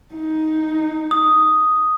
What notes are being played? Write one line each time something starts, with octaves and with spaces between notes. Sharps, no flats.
D#4
D#6